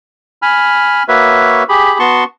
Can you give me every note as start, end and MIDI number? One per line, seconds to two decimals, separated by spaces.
0.42 1.03 80
0.42 1.03 83
0.42 1.03 89
1.08 1.63 58
1.08 1.63 66
1.08 1.63 71
1.08 1.63 73
1.08 1.63 76
1.69 1.98 67
1.69 1.98 68
1.69 1.98 83
1.99 2.24 59
1.99 2.24 66
1.99 2.24 81
1.99 2.24 84
1.99 2.24 85